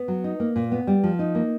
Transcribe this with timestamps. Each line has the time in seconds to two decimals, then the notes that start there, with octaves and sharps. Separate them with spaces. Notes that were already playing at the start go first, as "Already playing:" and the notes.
Already playing: B3
0.08 F#3
0.24 D#4
0.40 A#3
0.56 A#2
0.72 B3
0.87 G3
1.04 F3
1.19 D#4
1.35 A#3